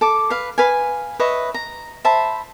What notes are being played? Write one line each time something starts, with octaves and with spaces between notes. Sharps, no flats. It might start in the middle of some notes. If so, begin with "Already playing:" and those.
A4 A5 D6
B4 F5
B4 F5 G#5
B4 C#5 D#5 E5
A#5
C5 E5 A5 B5